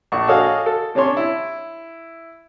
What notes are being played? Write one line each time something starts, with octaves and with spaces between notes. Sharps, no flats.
A#1 D4 C#6
F#4 G#4 A4 C#5 D#5 F5
A4
C3 C#4 D4 C#5 C6
E4